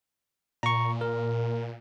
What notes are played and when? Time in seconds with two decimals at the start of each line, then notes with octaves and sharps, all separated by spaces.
0.63 A#2 A#5 C#6
1.01 A#4